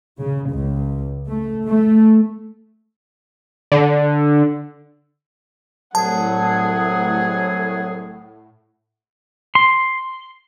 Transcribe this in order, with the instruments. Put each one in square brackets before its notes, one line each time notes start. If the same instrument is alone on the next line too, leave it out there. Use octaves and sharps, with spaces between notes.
[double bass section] C#3
C#2
A3
A3
[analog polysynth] D3
[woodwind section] C2 F#3 G#4 [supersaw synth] A2 [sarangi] F#5 [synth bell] A5
[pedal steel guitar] C6